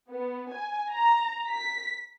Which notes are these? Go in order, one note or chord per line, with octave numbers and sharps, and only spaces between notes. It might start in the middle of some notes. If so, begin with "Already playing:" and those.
B3
G#5
A#5
B6